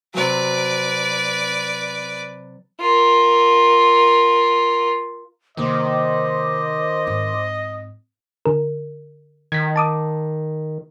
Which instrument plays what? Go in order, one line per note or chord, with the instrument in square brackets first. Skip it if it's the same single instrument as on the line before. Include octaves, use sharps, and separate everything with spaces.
[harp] C3 F#3 [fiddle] B4 D5
[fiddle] F4 A#4
[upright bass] C3 A#3 [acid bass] D#3 [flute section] C5 C6 D6 [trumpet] D#5
[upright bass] G#2 C4
[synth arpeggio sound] D3 A#4
[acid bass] D#3 [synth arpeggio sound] G#6 B6
[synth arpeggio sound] A5 D6 D#6